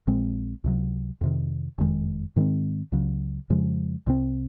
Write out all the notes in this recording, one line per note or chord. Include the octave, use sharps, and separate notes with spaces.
A#1 A#2 G#3 C4
C#2 C3 F#3
F2 C3 D#3
F#1 F2 D#3 G#3
G#2 D#3 G#3 C4
C#2 C#3 F#3
F2 C#3 F3 G#3
C2 C3 F3 C4